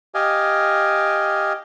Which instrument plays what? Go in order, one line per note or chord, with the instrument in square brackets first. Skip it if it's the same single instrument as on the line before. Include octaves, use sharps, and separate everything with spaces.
[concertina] G4 D#5 F5 G#5